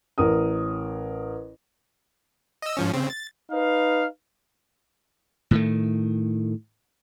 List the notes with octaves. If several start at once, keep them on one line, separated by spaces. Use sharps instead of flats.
A1 A#4 D#6
D#5 E6
G#2 F3 C#4
C#3 C4
A6
D#4 B4 F5
A2 D#3 A3